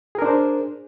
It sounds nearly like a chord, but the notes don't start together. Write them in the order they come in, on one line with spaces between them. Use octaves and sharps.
G#4 A#4 D4 C5